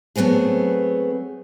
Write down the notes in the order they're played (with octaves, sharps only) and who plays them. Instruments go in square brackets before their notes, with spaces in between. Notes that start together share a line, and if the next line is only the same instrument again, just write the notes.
[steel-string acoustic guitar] F#3 A3 B3 C4 G#4